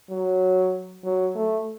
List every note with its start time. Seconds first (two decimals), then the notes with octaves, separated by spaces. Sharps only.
0.10 F#3
1.05 F#3
1.35 A3